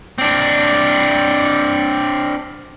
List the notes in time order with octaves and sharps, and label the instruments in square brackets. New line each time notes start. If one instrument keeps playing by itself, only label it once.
[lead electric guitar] C4 D4